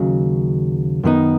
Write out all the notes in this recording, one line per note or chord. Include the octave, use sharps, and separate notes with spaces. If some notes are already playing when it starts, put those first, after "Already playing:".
Already playing: D#2 C#3 F#3
F#2 D#3 B3 D#4